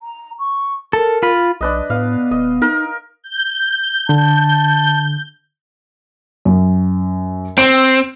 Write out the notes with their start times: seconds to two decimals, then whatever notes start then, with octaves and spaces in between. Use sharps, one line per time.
0.01 A#5
0.39 C#6
0.93 A4 A#4
1.23 F4 B5
1.61 B1 D4 B4 D#5
1.90 A2 B3 F5
2.31 D#1 D#5
2.62 D#4 A#4
3.23 G6
4.09 D3 A5
6.45 F#2
7.58 C4 D7